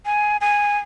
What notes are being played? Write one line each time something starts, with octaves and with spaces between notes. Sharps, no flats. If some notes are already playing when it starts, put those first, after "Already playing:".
G#5
G#5